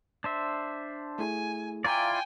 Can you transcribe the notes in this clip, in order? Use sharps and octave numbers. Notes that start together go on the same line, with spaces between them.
D4 C5 E5
A3 E4 G#4 G#5
E4 F4 D5 F5 G5 G#5 A#5 D6